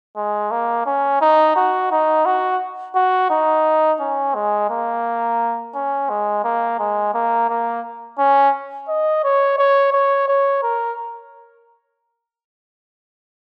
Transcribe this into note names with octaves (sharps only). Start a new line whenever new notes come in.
G#3
A#3
C#4
D#4
F#4
D#4
F#4
F#4
D#4
C#4
G#3
A#3
C#4
G#3
A#3
G#3
A#3
A#3
C#4
D#5
C#5
C#5
C#5
C#5
A#4